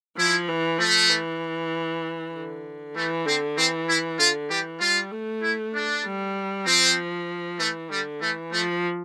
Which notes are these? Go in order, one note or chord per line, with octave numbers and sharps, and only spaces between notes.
F3 E4
E3
F3 A3
E3
D3
E3 A3
D3 C4
E3 C4
E4
D3 F4
E3 G3 G4
G3 F4
A3
E4
D4
G3
F3 C4
E3 A3
D3 G3
E3 A3
F3 A3